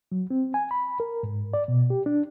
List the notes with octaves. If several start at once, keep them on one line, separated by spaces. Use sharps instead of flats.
F#3
C4
G#5
B5
A#4
G#2
D5
B2
G4
D4